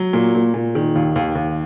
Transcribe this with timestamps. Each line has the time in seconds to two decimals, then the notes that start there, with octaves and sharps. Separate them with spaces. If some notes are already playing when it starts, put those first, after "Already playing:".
Already playing: F#3
0.13 A#2
0.35 A#2
0.54 A#2
0.75 D#3
0.95 D#2
1.16 D#2
1.35 D#2